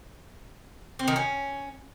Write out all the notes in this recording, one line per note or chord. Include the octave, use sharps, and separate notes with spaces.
C4
D#3
C#4